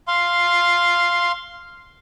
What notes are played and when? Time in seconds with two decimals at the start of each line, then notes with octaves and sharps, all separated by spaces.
0.08 F5 C6